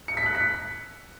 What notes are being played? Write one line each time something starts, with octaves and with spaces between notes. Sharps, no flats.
C#7
B6
F#6
B6